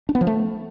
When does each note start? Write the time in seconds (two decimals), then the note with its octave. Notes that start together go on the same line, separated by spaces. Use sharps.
0.09 D4
0.15 B3
0.21 F3
0.27 A3